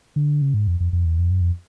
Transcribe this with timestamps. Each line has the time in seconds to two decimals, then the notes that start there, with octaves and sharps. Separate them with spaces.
0.16 D3
0.42 C#3
0.54 G#2
0.67 F2
0.80 F2
0.93 F2
1.05 E2
1.19 F2
1.31 F#2
1.41 F2